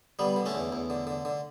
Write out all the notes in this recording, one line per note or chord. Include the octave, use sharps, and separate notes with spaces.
D3 G3 B3
D3
A3 C#4
E2
E2
D3
D3
D3